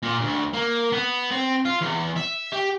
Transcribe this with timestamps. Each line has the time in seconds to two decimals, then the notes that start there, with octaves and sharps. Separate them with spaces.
0.03 A#2
0.21 D2
0.53 A#3
0.92 B3
1.31 C4
1.65 F4
1.81 E2
2.16 E5
2.52 G4